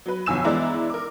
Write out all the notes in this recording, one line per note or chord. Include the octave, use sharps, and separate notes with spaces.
F#3 B4
G1 F2 B2 G#5 E6 E7
E3 G#3 B3 E4 D5 A#5
A#4 D6